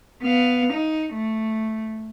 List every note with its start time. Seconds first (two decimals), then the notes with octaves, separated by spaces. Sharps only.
0.22 B3 F5
0.73 D#4
1.13 A3